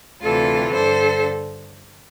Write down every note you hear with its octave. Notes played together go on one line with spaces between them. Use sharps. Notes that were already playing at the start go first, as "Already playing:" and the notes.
D2 C3 E3 F4 A4
G2 D3 A4 C5